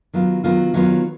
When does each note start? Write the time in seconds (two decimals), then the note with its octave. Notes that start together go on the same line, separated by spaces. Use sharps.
0.13 D#3 F#3 B3 F4
0.44 D#3 F#3 B3 F4
0.74 D#3 F#3 B3 F4